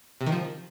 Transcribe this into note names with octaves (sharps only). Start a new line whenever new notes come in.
C3
D#3
F3